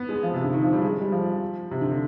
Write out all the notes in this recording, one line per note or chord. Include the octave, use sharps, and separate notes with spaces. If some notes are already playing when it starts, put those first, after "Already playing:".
Already playing: B3
G#3
F3
C3
D3
D#3
F3
G3
G#3
G3
F3
C3
D3
D3